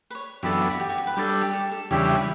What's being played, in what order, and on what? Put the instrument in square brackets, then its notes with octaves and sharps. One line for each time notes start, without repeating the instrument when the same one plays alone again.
[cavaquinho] B4
C#5
[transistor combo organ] F#2 E3 B3 D4 A4 [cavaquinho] G4
[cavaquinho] F#4
E4
F#4
G4
F#4
G4
B4
[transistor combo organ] G3 D4 A4 [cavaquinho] C#5
[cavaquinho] D5
G4
A4
A4
[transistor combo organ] E2 C#3 E3 G3 D4 [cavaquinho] G4
[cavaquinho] E4